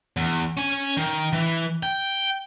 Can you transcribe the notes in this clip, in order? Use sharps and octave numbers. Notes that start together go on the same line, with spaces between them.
E2
C#4 G#5
D#3
E3
G5